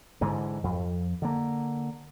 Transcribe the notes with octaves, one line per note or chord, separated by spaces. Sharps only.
G#2 D3 E3
F2
D3 A#3